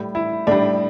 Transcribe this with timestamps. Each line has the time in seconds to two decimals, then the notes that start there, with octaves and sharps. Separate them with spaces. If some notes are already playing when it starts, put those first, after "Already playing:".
Already playing: A2 G3
0.15 E4
0.47 A2 G3 D4